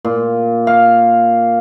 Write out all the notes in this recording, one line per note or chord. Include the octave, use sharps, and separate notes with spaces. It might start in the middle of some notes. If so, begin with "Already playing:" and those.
A#2
F5